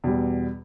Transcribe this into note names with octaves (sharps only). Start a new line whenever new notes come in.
E2 B2 G3